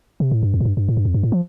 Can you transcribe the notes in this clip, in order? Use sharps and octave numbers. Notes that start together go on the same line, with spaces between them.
C3
A2
G2
F2
A2
G2
G2
A2
G2
F2
G2
A2
F3